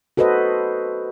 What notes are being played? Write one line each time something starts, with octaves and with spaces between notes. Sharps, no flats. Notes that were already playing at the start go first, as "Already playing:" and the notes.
F#4 A4 B4 C5 D#5